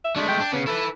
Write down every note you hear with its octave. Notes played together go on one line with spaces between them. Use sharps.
E5
G#3 A3 D4
G5
D4
C#3 B3
E4 A4 B4